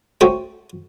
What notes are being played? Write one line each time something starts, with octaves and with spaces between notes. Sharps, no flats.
A3 C#4 F#4 C5 G5